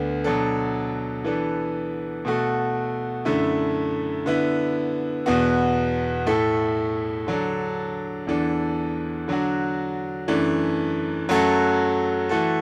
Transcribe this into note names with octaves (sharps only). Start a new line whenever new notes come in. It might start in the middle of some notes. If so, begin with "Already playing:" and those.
Already playing: D2 D3 B3
B2 F#3 D4 A4
E3 B3 D4 A4
B2 A3 F#4 A4
F#2 D3 A3 E4
D3 B3 E4
E2 B2 B3 F#4
A2 A3 E4 A4
D3 F#3 D4 A4
E2 E3 D4 A4
D3 F#3 D4 F#4
F#2 E3 A3 D4
F#2 F#3 A3 F#4 A4
E3 A3 F#4 A4